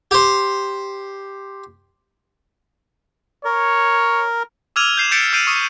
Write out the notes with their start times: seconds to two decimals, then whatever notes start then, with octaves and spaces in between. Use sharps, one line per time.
0.11 G4 C5
3.45 A#4 C#5
4.76 D6 E6 F6 G#6 D#7 F7
4.97 G6 C7 E7
5.11 D6 G6 A6 B6 C#7 D7
5.33 E6 G6 C7 D7 D#7 F7
5.47 C#6 D#6 C#7